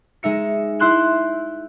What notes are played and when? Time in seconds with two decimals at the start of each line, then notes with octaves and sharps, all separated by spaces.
0.23 G#3 D#4 E5 C#7
0.79 E4 E5 C6 F#6 G6 E7